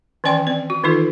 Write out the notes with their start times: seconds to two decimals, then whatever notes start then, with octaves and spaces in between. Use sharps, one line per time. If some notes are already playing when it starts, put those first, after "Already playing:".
0.24 D#3 E3 C#4 D5 G5 C6
0.47 C4 D5
0.70 F#4
0.84 D#3 E3 D#4 F4 A4